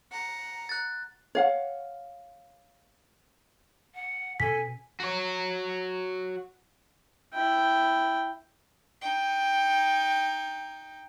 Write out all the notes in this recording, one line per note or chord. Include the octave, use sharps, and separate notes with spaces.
F#5 A#5
F#6 A6
C#5 F5 F#5
F#5
B2 C#4 A4 G#5 B6
F#4 C#5
E4 G5
D#4 G5